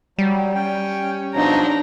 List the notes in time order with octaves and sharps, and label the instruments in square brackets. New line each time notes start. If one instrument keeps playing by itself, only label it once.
[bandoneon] F#3 [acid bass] G3
[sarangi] C#4 [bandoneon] G5
[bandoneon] B2 F3 F#3 [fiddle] D4 D#4 [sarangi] A#5